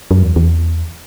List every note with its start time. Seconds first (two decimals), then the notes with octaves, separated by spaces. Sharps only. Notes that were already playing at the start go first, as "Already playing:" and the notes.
0.11 F#2
0.23 E2
0.36 E2